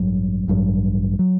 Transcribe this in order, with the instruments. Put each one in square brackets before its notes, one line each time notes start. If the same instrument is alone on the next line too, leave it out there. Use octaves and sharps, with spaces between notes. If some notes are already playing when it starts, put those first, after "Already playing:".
Already playing: [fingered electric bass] A1 G2 F#3
A1 G2 F#3
F#3